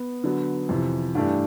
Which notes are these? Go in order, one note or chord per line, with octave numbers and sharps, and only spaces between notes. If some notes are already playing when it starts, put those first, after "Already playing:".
Already playing: B3
D3 F#3 B3
F2 C3 E3
G2 E3 A3 D4 G4